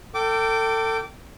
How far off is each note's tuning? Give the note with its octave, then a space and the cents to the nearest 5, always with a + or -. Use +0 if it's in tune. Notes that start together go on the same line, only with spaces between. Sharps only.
A4 +30 G5 -20 D6 -10